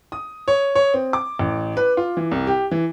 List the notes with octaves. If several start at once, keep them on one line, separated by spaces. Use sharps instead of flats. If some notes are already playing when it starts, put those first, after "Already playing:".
D#6
C#5
C#5
C4
D6
A1
B4
F4
E3
C2
G4
E3